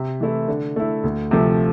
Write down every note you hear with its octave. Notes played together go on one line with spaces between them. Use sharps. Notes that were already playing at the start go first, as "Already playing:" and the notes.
Already playing: C3
E3 A3 E4
D3
A3 E4
D2
C3 F3 A3